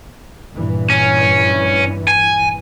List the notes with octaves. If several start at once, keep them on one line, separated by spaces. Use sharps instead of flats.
G2 A#2 E3
C#4
G#5